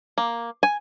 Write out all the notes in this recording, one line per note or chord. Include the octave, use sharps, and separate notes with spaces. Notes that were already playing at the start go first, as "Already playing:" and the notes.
A#3
G#5